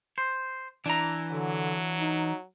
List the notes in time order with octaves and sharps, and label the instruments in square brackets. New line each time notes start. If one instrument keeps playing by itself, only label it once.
[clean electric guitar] C5
[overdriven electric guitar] E3 [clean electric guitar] D4 A#5
[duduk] D3 [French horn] F#3
[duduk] D#4